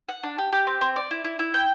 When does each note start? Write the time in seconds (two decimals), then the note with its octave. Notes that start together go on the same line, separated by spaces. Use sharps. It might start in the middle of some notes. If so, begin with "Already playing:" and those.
0.09 F#5
0.23 D4
0.38 G4
0.52 G4
0.67 C4
0.81 C4
0.96 D5
1.11 E4
1.24 E4
1.39 E4
1.54 G5